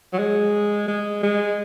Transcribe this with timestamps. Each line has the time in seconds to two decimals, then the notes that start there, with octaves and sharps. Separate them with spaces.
0.13 F#3
0.19 G#3
0.88 G#3
1.23 G#3